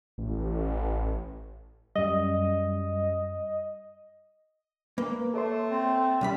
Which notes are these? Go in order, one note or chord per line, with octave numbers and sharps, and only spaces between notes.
A1
F#2 G3 D#5
A#3 B4
A3 A4 C#5 C6
C4
C2 G3 C#4 B5